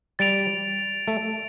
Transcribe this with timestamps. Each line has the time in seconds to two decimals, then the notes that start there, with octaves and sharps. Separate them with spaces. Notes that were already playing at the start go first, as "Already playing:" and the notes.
0.19 G3 A6 D7 F7
1.08 A3